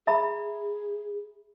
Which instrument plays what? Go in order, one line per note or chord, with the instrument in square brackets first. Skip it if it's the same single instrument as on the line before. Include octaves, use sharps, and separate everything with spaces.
[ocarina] G#4 [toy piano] E5 A#5 B5